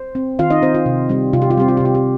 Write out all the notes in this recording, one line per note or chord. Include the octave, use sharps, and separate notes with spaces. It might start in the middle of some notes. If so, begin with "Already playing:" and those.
Already playing: C5
C4
D#3 F4 F5
D#4 D#5
C4 C5
F4
C3
G3 C4
C3 F4
G4
F4
G3 C4 G4
F4
C3 G4
F4
G4